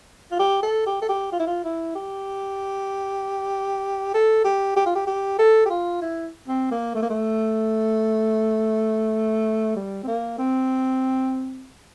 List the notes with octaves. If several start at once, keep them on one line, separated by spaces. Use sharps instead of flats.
F4
G4
A4
G4
A4
G4
F4
E4
F4
E4
G4
A4
G4
G4
F4
G4
G4
A4
G4
F4
E4
C4
A#3
A3
A#3
A3
G3
C4
A#3
C4